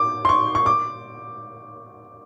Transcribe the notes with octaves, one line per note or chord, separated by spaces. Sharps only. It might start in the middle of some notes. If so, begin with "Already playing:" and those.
Already playing: D6
C6
C#6
C#6
D6